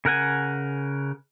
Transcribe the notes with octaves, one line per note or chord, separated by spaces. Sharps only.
C#3 A#4 F#5 G#5